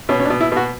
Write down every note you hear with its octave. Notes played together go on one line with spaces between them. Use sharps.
B2 C#4
C#4
D4
B2
E4
B2 F#4